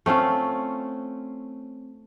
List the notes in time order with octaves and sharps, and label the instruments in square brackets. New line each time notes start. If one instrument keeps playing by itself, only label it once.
[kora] A3 C4 C#4 F4